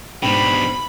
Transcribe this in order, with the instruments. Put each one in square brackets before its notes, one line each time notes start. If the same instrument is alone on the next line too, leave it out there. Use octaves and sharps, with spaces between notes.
[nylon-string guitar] G#2 D4 G5 [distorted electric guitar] B2 G3 [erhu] B5